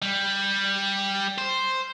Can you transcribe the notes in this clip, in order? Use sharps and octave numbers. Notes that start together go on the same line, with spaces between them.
G3
C5